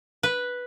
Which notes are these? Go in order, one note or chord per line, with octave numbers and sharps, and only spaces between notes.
B4